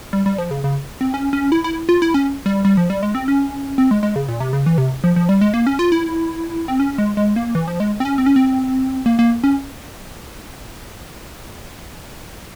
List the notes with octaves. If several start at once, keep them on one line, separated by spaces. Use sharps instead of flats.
G3
G3
F3
C#3
C#3
C4
C#4
C#4
E4
E4
F4
E4
C#4
G3
G3
F3
G3
G#3
C4
C#4
C4
G#3
G#3
C#3
A#2
C3
C#3
E3
C3
F3
F3
G3
G#3
A#3
C#4
F4
E4
C4
C#4
G#3
G#3
A#3
E3
F3
G#3
C4
C#4
C4
C#4
C4
A#3
A#3
C#4